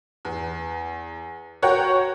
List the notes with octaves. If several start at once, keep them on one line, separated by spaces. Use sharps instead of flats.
E2
F#4 A#4 C#5 F#5 G5